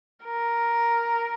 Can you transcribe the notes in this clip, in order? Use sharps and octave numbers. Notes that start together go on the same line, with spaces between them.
A#4